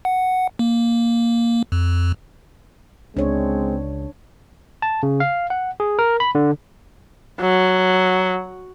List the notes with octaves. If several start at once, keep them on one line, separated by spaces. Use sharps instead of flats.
F#5
A#3
F2
C#2 G#3 C4 D4 C#5
A5
C#3
F5
F#5
G#4
A#4
B5
D3
F#3